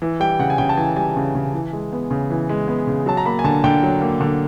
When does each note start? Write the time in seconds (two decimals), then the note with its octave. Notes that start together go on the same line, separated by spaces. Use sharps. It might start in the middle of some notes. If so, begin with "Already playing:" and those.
0.02 E3
0.20 G3 G5
0.39 C#3 F#5
0.50 G#5
0.58 C#3 G5
0.69 A5
0.77 E3 G#5
0.97 G3 G#5
1.16 C#3
1.35 C#3
1.54 E3
1.73 G#3
1.92 B3
2.11 C#3
2.30 E3
2.49 G#3
2.68 B3
2.87 C#3
3.06 F#3 A5
3.17 A#5
3.25 A#3 B5
3.39 G#5
3.44 D3 A5
3.64 D3 G5
3.83 F#3
4.01 A#3
4.21 D3